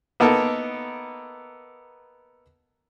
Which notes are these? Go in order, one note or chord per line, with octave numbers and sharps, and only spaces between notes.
A#3 B3 D#4 A4 A#4